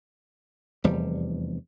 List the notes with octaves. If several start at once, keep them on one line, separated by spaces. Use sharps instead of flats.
F1 E2 G3